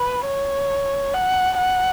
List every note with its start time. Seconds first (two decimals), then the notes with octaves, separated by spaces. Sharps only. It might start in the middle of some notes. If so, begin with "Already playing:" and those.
Already playing: B4
0.26 C#5
1.14 F#5
1.58 F#5